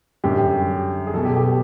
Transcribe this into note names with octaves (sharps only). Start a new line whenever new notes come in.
F#2 D3 G3 G4
G#4
B2 F#3 B3 A4
G4
G4